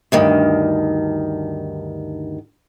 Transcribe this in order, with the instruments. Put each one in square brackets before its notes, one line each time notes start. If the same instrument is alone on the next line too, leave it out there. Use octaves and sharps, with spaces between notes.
[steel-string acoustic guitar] D2 G2 D#3